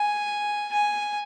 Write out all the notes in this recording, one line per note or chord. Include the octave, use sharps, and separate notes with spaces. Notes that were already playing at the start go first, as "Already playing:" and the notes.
Already playing: G#5
G#5